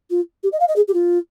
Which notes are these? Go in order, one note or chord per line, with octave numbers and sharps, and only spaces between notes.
F4
G4
D#5
F5
D#5
G#4
G4
F4